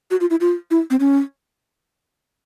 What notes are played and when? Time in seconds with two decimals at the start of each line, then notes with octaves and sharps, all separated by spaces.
0.11 F#4
0.21 F4
0.30 E4
0.41 F4
0.71 E4
0.90 C4
1.00 C#4